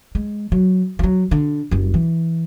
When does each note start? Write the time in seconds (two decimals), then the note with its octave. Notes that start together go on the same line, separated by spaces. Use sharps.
0.15 G#3
0.52 F#3
0.99 F3 F#3
1.31 D3
1.71 F#1 G3
1.94 E3